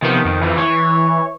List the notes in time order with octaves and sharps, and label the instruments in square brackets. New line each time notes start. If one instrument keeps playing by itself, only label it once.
[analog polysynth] C3 F3 B3 [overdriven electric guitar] D#3
[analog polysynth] F2
[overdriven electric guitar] E3 F3
[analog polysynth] E3 [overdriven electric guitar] C#5